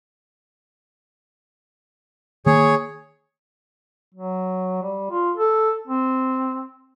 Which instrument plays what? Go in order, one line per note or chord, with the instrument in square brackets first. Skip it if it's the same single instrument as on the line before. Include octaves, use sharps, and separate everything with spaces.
[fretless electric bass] D#3 A#3 [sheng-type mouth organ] G#4 C#5
[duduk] F#3
G3
F4
A4
C4